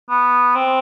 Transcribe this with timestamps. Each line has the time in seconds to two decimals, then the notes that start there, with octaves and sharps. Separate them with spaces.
0.10 B3
0.55 C4